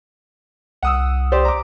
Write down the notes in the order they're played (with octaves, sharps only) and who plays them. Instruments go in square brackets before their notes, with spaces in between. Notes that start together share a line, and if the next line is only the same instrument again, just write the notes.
[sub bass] C2 [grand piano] F#5 D#6 E6
[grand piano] G4 C5 D5
A#5 D6